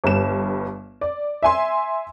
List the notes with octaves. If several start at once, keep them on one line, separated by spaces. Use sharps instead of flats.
G1 G2 E7
D5
E5 G#5 C6